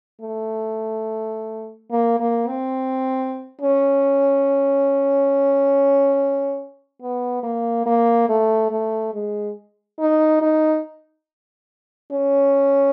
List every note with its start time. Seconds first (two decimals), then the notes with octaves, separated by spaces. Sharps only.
0.21 A3
1.91 A#3
2.20 A#3
2.48 C4
3.61 C#4
7.01 B3
7.43 A#3
7.86 A#3
8.29 A3
8.71 A3
9.14 G#3
9.99 D#4
10.41 D#4
12.12 C#4